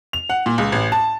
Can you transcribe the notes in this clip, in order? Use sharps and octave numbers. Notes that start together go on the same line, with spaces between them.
F7
F#5
A#2
C#2
A1
A5